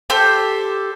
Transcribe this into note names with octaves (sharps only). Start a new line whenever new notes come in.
G4 A4 C5